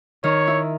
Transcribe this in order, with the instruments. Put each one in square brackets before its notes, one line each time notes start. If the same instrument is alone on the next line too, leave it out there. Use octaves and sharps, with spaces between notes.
[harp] D#3 [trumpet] C#5
[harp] E4